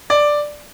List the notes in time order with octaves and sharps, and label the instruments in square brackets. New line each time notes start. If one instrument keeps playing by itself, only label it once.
[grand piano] D5